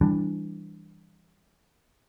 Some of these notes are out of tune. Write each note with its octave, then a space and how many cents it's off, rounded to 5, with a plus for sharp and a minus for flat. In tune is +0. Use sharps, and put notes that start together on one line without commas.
E3 +0 G3 +15 D4 +0